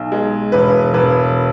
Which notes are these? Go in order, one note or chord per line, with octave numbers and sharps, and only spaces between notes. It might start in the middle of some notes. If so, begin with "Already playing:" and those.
Already playing: B1
G#3
E1 B4
E1 B4